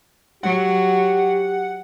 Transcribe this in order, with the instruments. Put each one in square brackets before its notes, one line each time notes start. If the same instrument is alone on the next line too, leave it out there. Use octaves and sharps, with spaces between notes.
[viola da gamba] F#3 [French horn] G4 [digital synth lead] F#5